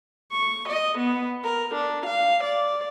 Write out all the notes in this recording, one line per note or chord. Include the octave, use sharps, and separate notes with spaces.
C#6
D#5
B3
A#4
D4
F5
D5